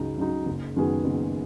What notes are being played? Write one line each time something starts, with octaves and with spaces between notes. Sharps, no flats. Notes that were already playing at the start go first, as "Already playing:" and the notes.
Already playing: C#2 C#3 F#3 D#4
C#3 F#3 D#4
F#1
F#2 D#3 B3 G#4
F#1